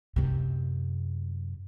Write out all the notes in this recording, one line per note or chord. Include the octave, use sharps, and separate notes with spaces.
F#2 C3